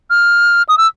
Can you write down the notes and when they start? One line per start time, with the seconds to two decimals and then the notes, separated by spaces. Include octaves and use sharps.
0.10 F6
0.69 D#6
0.78 E6